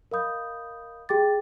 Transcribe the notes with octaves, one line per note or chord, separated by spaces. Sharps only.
A#4 D#5 F5 B5 D#6 G6
G4 G#4 G5 D6 A6